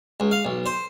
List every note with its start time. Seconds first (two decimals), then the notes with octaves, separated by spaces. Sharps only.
0.20 C#2
0.31 F5
0.45 B1
0.66 C5